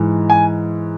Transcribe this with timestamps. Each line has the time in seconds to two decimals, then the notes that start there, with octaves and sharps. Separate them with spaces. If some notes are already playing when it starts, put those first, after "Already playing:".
Already playing: G#2 E3
0.30 G#5